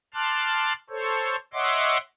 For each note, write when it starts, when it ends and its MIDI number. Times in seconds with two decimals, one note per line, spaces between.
0.14 0.73 81
0.14 0.73 84
0.14 0.73 86
0.14 0.73 89
0.14 0.73 90
0.90 1.36 69
0.90 1.36 72
0.90 1.36 73
1.53 1.98 73
1.53 1.98 75
1.53 1.98 76
1.53 1.98 78
1.53 1.98 84
1.53 1.98 86